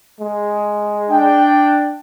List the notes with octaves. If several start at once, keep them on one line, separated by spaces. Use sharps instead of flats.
G#3
D4 G5